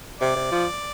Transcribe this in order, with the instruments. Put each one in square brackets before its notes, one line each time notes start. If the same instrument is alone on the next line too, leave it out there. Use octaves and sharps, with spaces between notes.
[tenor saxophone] C3 [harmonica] D5
[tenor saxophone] C3
F3